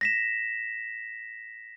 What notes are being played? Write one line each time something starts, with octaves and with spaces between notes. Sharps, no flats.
A#6 B6 E7